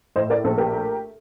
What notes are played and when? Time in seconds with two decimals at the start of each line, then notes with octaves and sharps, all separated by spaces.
0.16 A2 C5 D#5
0.30 A#4 D5
0.44 A#1 A4 C5
0.58 G4 A#4
0.73 A3